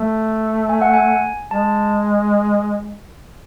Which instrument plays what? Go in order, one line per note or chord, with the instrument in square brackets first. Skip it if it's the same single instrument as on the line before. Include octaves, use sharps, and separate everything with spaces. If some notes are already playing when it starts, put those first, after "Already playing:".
Already playing: [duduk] A3
[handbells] G#5
F#5
G#5
[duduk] G#3 [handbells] A5